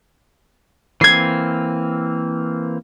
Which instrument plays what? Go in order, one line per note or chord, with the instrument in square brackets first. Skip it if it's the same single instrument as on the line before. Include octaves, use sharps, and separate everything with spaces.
[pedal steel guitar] E3 A#3 C4 [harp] G#6 C7